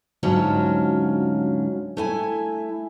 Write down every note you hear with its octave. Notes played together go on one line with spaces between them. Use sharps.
D2 G#2 F#3 C#4 F4 A5
A3 E4 G#5